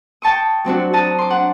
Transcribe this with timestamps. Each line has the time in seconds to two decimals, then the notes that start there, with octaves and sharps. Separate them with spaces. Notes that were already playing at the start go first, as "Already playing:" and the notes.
0.22 G5 A5 C#6 D#6
0.65 F#3 C4 D4 F#4
0.93 F#4 A5 A#5 D#6
1.19 C6 D6
1.30 D4 F#5